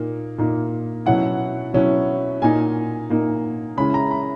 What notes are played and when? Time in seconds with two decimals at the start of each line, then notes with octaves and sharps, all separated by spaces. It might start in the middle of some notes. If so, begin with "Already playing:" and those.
Already playing: A#2 A#3 D#4
0.38 A#2 A#3 D#4
1.06 B2 F#3 C#4 E4 F#5
1.74 B2 F#3 C#4 E4
2.42 A#2 A#3 D#4 G#5
3.10 A#2 A#3 D#4
3.77 C#3 G#3 C#4 E4 B5
3.94 A#5
4.11 B5